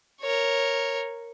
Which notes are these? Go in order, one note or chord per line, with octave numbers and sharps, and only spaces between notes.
A#4 C#5